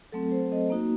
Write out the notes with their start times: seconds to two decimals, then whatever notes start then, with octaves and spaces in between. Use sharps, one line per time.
0.12 F#3 A3 C4 A4
0.32 C5
0.52 D#5
0.70 A#3 D#4 F#4